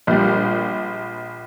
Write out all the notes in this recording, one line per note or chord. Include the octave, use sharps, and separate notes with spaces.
A#1 G3